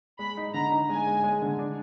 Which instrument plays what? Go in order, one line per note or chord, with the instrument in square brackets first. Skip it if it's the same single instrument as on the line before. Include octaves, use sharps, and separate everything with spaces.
[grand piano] G#3 [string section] B5
[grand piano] D#4
[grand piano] D3 [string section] A#5
[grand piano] D#4
[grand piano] G#3 [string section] G#5
[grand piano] G#3
G#3
D3
D4